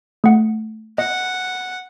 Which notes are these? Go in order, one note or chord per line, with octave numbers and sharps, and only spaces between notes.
A3 F#5
D#5 F#5